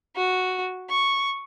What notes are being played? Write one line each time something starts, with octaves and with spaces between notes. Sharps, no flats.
F#4
C#6